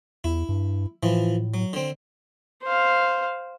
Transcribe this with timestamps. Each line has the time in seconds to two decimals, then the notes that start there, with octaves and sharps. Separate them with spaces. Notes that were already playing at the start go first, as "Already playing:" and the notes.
0.24 E2 E4
0.49 G2
1.03 A2 E3 F3
1.54 F#3
1.73 D3 C4
2.63 C5 F5